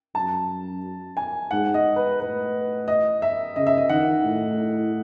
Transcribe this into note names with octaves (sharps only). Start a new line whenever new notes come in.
F#2 A5
G#5
G#2 F#5
D#5
B4
A2 B4
D#5
E5
C#3 D#5
E5
D#5
D#3 F#5
A2